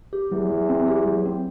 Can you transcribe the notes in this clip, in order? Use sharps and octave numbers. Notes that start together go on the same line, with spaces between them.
G4
E2 F#3
F#3
C4
G4
F#3
C4